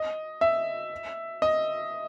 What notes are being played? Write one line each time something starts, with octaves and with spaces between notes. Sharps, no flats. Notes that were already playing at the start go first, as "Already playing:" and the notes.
Already playing: D#5
E5
D#5